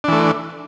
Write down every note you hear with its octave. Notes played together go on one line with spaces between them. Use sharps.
E3 A3 D4